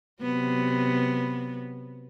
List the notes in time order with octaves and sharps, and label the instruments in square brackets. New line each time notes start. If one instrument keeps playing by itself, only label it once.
[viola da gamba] C3 F#3 B3